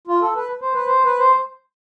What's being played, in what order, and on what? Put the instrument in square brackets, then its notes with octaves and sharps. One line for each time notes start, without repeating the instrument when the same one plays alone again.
[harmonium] F4
A4
B4
C5
B4
C5
B4
C5